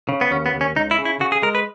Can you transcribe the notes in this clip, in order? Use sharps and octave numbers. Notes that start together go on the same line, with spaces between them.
C#3
B3
D#2 C#4
B3
D#2
C#4
C#2 D#4
E4
C#3
E4
C#3 F#4
G#4
G#3 A#4
B4